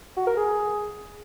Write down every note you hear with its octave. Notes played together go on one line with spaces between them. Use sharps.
F#4
A#4
G#4